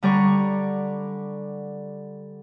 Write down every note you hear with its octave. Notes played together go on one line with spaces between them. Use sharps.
D3 G3 D5 A#5 C#6